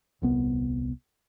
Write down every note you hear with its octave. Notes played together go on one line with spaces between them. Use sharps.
D#1 C2 B3